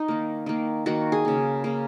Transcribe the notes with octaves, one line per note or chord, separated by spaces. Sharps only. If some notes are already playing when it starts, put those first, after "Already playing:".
Already playing: D#4
D#3 A#3
D#3 A#3
D#3 A#3 F#4
G#4
C#3 A#3
C#3 A#3